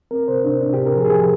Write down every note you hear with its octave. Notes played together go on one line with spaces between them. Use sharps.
C4 A#4
C3 C5
C3 D4
C3 D4
C3 G4
A#4
F3 G#4
G#4
F3 G4